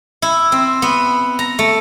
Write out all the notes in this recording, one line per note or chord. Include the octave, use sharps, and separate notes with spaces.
E4
C4
B3
A#5
A3